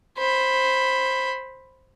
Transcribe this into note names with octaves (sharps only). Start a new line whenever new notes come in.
C5 B5